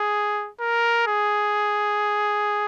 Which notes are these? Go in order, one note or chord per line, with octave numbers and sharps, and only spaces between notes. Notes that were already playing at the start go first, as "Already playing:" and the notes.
Already playing: G#4
A#4
G#4